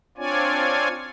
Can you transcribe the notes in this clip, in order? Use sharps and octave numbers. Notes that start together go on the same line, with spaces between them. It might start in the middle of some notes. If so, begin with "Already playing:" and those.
C4 D4 F4 C#5 D5 G#5